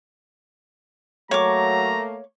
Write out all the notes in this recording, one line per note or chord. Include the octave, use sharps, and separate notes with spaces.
F#3 A3 A#3 C#5 A#5 D6